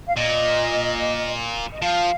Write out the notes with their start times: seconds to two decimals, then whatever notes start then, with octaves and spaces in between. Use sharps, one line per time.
0.08 F5
0.16 A#2 D#5
1.73 D#5
1.81 F3 F5